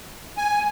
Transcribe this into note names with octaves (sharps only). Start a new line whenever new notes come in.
G#5